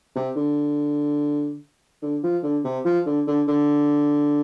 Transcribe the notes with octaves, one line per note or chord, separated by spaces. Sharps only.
C3
D3
D3
F3
D3
C3
F3
D3
D3
D3